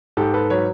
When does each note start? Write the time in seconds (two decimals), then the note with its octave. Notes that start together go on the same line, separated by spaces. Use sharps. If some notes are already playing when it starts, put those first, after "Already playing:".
0.17 G#2 G4 A4
0.34 A4 B4
0.50 F#3 B4 C#5